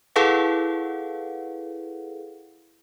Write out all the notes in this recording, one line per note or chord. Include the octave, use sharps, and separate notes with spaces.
E4 G#4 A4 B4 F5 F#5